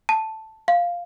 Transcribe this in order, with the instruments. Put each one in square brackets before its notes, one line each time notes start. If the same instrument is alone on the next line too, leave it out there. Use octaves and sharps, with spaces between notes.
[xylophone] A5
F5